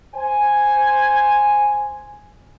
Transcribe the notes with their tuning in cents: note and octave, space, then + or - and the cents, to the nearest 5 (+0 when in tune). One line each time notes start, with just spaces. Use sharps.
C5 +0 G#5 +0